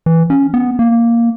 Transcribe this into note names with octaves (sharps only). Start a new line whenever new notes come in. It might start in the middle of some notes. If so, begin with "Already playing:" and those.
E3
C#4
B3
A#3